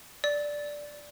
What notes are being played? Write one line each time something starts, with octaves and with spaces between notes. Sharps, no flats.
D5